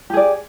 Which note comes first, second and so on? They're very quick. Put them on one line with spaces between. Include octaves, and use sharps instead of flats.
G4 G#4 D5